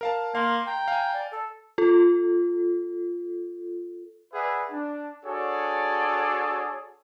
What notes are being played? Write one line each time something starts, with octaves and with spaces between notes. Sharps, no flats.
A#4 F5 A5
A#3 F5 C6
G5 A#5
F5 G#5
D5
A4
F4 A4
G#4 B4 D5 E5 F#5 G#5
D4
D4 F#4 G#4 A4 C#5 D5